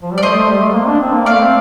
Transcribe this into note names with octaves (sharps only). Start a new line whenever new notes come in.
F3
G3
D5
A3 C5 D#5
A3
G3
A3
A#3
D4
C4
A#3
A3 D5 F5
C4